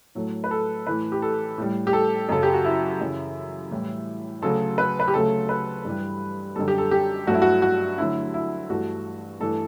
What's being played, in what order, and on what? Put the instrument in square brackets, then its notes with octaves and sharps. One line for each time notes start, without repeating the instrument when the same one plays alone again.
[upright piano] A2 F#3 A3
B4
A4
A2 E3 A3 B4
G4
A4
A2 G3
G4
A4
F#2 C#3 F#3 A4
G4
F#4
E4
F#2 C#3 E3
A2 E3 G3
D2 C#3 F#3 A4
B4
B4
G4
D2 C#3 F#3 A3 A4
B4
G2 E3 G3
F#2 D3 G3 A4
G4
A4
G4
G2 F#3 A3 F#4
E4
F#4
F#4
D2 D3 F#3 E4
E4
G2 E3 A3 F#4
G2 E3 A3 A4